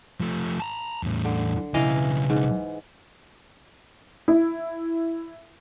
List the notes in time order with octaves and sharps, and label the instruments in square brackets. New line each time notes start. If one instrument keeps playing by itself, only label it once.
[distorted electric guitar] F3 A3
A5 A#5
E2 A2
[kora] D3
[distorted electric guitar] B1 C#3 [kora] E3 D#5 F5
[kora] G#2
[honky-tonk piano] E4